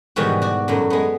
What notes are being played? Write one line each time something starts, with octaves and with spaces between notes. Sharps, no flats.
G#2 B2 D#3 E3 G3 F#4
F#4 D5
F#2 A2 F#3
G#3 B3